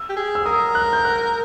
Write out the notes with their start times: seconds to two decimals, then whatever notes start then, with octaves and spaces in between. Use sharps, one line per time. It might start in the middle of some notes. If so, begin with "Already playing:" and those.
Already playing: E6
0.09 G4
0.16 G#4
0.35 E6
0.46 A#4 D#6
0.75 F#6
0.93 G6
1.05 F#6